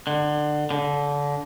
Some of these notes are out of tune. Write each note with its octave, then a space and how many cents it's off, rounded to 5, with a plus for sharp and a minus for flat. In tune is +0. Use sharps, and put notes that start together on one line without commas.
D3 +25
D3 -25